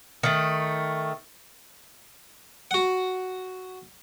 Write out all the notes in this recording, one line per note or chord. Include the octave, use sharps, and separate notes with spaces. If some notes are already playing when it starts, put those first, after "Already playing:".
D#3 A3
F#4 F#5